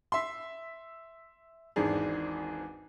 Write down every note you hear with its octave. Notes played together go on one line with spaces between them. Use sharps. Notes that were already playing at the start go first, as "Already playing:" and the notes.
E5 C6
G#1 E2 G#2 D4 G#4